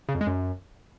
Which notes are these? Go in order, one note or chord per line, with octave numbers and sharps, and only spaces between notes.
C#3
F2
G#3
F#2